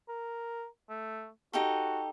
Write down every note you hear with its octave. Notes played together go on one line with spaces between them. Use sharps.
A#4
A3
D#4 F#4 G4 A4